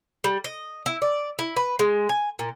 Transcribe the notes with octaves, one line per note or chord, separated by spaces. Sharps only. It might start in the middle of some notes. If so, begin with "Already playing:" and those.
G3
D#5
E4
D5
E4
B4
G#3
G#5
A#2